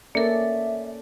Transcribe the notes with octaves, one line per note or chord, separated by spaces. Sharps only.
A#3 C#4 A4 A#4 D5 E5